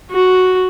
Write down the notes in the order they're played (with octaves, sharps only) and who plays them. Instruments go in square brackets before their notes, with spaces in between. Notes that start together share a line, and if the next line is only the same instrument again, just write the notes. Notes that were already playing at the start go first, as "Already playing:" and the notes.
[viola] F#4